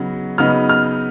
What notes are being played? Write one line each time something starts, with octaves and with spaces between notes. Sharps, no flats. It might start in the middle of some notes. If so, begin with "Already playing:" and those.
Already playing: C#3 F#3 B3 D#4
C#3 F#3 B3 D#4 F6
F6